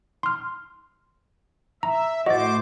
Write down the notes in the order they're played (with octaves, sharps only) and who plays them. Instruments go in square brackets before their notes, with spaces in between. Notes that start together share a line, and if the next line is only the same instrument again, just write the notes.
[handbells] C6 F6
[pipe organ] E5 [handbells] A#5
[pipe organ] A2 C5 D6 [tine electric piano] F#4 [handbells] D#5 A6